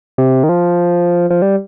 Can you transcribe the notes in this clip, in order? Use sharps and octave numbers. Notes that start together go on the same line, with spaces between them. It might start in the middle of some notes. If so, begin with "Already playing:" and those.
C3
D#3
F3
F3
G3